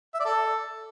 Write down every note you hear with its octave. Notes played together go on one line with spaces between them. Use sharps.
E5
D5
A4